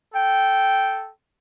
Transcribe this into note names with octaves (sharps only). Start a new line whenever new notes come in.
A4 G5